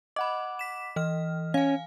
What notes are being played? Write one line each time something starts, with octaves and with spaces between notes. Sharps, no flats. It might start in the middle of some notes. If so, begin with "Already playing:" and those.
D#5 F#5 B5 D6
B6 E7
E3 D#5 F6
C#4 F5 G#5